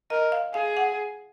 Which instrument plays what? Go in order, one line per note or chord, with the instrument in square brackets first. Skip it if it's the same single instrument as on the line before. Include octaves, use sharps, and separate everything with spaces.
[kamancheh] A#4 [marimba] D#5
[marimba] F5
[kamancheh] G#4 [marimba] F5
[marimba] F#5